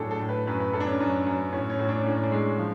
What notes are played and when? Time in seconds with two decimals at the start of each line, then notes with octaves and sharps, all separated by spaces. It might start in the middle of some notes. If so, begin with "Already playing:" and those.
Already playing: A2 F#3 D4 F#4 G#4 A4
0.11 A4
0.20 A2
0.29 B4
0.47 F#2 B4
0.60 B4
0.73 F#2 A4
0.80 D4
0.87 C#4
1.00 F#2
1.27 F#2
1.53 A2 C#4
1.70 C#4
1.79 A2
1.88 D4
2.05 A2 C#4
2.23 D4
2.31 G#3
2.59 F3